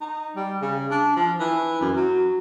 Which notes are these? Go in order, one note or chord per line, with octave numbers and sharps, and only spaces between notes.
D#4
G3
C#3
D4
F3
E3
F#2
F#3